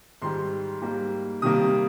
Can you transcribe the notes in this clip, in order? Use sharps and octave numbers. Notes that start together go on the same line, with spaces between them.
G#2 D#3 G3 C6
G#2 G3 A#3
C3 D#3 G3 A#3 D#6